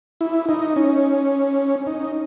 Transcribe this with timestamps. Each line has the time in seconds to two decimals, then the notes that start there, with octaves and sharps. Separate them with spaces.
0.21 E4
0.49 D#4
0.76 C#4
1.87 D#4